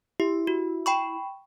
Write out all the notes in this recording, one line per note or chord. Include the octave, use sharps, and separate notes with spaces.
E4 G4
F#4
G5 B5 C#6